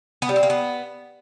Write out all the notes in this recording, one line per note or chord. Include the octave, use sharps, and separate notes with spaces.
B3
G3
C4
A#3
B3